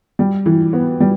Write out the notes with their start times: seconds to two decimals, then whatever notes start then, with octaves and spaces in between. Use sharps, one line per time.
0.19 G3
0.46 E3
0.73 B3
1.00 G3